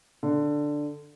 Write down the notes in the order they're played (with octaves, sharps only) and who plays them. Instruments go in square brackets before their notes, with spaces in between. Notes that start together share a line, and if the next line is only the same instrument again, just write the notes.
[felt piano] D3